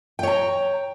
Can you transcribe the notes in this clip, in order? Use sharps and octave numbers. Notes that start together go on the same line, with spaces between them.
C#5 G5 A#5